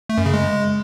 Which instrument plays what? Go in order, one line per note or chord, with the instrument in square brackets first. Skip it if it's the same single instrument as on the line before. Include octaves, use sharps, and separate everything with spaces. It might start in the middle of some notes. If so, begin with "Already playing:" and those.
[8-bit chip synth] A3
F#2
C#3
G#3